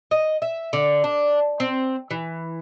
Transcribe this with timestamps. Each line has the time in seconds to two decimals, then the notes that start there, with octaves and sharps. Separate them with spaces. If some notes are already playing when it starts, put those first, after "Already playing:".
0.11 D#5
0.42 E5
0.73 D3
1.04 D4
1.60 C4
2.11 E3